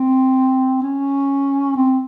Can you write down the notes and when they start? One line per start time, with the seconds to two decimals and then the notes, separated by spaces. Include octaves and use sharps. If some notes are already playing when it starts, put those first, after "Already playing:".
Already playing: C4
0.82 C#4
1.76 C4